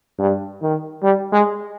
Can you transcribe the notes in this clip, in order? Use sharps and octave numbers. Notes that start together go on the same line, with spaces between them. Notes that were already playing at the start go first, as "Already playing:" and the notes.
G2
D#3
G3
G#3